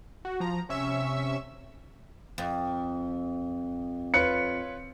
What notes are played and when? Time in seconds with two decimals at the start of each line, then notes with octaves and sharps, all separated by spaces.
0.25 F#4
0.40 F3 A#5
0.69 C3 C#4 E5 C#6 E6
2.38 F2
4.14 F4 B4 C#5 C#7